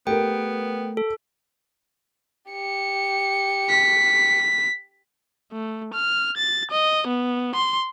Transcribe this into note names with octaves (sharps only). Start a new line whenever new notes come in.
A3 B3 G4 A#4 G5
A4
G4 C#7
B6
A3
F6
A6
D#5
B3
C6